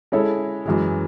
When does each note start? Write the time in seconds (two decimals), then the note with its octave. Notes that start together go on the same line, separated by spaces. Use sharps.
0.12 G#3 C#4 E4 A4 C#5
0.66 F#2 E3 G#3